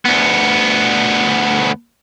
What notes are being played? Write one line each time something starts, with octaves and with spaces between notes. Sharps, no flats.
D2 B3